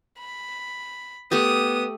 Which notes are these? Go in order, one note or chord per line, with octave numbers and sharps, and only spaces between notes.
B5
A3 B3 G4 D#6